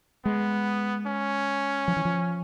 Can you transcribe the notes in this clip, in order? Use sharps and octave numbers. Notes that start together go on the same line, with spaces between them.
G#3 B3
C#4
F3
E3
F3